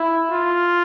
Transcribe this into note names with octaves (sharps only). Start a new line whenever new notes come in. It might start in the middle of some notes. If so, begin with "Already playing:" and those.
Already playing: E4
F4